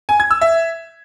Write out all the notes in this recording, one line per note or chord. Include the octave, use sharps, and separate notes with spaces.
G#5
G#6
E6
E5